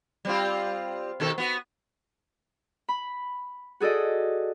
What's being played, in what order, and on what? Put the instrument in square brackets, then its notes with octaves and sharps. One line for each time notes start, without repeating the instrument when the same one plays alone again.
[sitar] G3 C4 F4
B2 D#3 A4
B3 F#4
[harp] B5
F#4 G#4 A4 D5 D#5